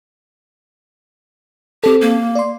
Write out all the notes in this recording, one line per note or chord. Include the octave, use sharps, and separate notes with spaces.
C4 G4 A4
A#3
D5 C6